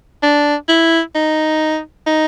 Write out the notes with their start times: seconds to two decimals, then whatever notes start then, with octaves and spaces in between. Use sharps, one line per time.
0.23 D4
0.69 E4
1.15 D#4
2.07 D#4